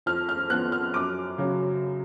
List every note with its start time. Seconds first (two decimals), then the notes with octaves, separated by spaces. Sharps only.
0.06 F2 F6
0.29 F6
0.50 F3 B3 F#6
0.72 F6
0.94 F#2 D6
1.38 C#3 F#3